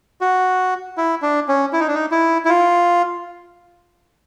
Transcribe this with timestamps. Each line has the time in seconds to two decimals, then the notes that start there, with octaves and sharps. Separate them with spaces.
0.21 F#4
0.97 E4
1.22 D4
1.48 C#4
1.73 E4
1.80 D#4
1.88 D4
1.95 D#4
2.11 E4
2.45 E4
2.49 F4